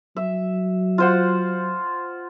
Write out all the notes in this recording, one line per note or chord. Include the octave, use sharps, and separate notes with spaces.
F#3 E5
F4 C5 F#5